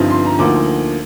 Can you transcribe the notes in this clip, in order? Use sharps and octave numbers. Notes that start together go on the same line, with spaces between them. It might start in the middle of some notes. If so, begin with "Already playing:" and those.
Already playing: G1 G2 F3 C4 D#4
C6
A#5
D2 D3 F3 A#3 D#4 D6